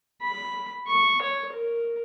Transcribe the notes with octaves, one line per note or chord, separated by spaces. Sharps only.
B5
C#6
C#5
A#4